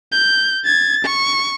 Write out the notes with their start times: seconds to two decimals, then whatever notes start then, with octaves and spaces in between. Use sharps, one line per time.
0.12 G6
0.65 G#6 A6
1.05 C#6